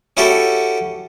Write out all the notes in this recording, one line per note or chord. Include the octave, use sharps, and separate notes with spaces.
C#4 E4 F#4 G4 A4 C#5